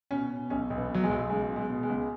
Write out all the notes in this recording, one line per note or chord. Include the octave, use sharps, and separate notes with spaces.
B2 C#4
B2
B1 C#4
B1
B3
B2 F#3
G#3
B1
C#2 G#3
B2
G#3
B2
G#3
C#2